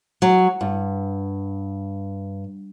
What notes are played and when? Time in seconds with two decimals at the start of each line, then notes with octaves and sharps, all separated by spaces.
0.22 F#3
0.61 G2